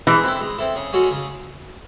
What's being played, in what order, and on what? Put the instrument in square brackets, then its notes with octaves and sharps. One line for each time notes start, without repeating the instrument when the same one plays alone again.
[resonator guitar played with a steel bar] E3 [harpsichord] G#3
[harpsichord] C4 E4 A4
G#3
C4 E4 A4
C#3
G#3 C#4 F#4 A4
C#3